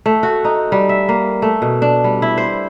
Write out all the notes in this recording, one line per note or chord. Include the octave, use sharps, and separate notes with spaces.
A3
F#4
D#4
G3
E5
A#3
A3
B2
D4
G3
E4
C5